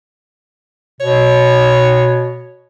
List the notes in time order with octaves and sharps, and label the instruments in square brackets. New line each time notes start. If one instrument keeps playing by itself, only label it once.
[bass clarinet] B2 [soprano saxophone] C#5